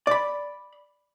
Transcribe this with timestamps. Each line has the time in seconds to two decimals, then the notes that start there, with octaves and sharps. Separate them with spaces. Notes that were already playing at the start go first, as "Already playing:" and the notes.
0.07 D5 B5